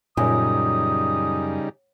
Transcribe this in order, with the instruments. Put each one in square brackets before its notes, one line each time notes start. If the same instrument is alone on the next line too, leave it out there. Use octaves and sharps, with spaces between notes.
[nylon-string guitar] F#2 [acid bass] A#2 [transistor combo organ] C#3 G3 D#4 [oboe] D#6